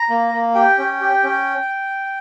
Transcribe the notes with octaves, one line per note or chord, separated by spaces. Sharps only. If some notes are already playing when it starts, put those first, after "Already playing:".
Already playing: A#5
A#3
A#3
G4 G5
C#4
G4
C#4